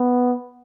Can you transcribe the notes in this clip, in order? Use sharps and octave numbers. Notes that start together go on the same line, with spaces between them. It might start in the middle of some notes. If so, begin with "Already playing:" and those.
Already playing: B3